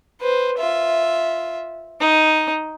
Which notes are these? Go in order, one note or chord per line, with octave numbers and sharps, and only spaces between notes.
B4 C5
F4 E5
D#4 D#5